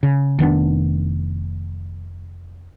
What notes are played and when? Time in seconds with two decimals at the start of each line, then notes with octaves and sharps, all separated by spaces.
0.03 C#3
0.39 F1 D#3 B3 D4